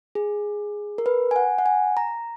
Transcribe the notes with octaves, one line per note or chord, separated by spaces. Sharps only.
G#4
A#4
B4
G#5
F#5
F#5
G#5
A#5